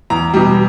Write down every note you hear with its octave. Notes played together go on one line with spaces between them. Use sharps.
E2 A#5
B2 G3